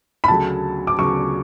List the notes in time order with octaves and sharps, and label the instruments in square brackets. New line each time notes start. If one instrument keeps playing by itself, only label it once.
[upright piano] B5
[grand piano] D2 C#3 F#3 [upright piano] A5
[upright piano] D6
[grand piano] D2 C#3 F#3 [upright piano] C#6